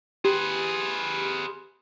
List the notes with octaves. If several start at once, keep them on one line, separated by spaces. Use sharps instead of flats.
G4 G#4 B4 C6